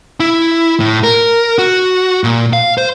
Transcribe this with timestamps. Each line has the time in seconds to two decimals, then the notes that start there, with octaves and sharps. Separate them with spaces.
0.20 E4
0.80 A2
1.03 A#4
1.59 F#4
2.24 A#2
2.53 F5
2.78 C5